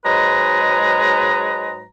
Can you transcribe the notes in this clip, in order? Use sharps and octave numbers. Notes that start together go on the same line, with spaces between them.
G#2 F#3 G#3 B4 A#5